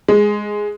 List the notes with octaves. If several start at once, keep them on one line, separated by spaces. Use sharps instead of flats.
G#3